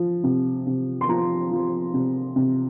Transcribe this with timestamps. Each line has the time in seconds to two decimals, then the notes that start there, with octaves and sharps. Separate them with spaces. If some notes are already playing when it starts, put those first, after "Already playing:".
Already playing: F3
0.24 C3
0.67 C3
1.01 C6
1.09 F3 A#5
1.51 F3
1.94 C3
2.36 C3